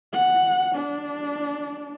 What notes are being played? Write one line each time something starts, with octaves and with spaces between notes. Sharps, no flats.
F#5
D4